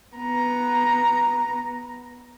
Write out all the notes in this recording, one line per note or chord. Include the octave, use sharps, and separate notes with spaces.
B3 A#5